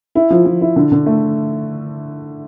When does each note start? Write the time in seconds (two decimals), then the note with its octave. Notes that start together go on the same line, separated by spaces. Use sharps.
0.15 E4
0.30 F3
0.45 F3
0.61 E4
0.76 D3
0.92 D3
1.06 A3